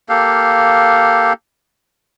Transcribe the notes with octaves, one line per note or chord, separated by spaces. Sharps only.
A#3 G4 A4 F5